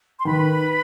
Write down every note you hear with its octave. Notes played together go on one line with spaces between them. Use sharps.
C6
D#3 B4 B5